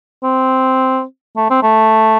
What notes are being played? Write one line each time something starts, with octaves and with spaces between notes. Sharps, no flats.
C4
A3
C4
A3